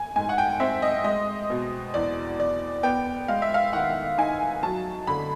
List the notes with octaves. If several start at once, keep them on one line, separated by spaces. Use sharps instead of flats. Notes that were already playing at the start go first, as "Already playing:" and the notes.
Already playing: G#5
G#2 G#5
F#5
G5
C4 E5
D#5
G#3 D#5
B2
E2 D5
E2 D5
B3 G5
G#3 F5
E5
F5
D#3 F#5
D#4 G#5
F#3 A5
D3 B5